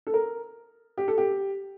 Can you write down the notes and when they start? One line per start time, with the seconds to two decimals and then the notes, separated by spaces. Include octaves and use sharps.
0.07 A4
0.14 A#4
0.98 G4
1.08 A4
1.18 G4